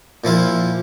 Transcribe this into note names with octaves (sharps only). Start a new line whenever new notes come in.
A#2 F3 E4 F4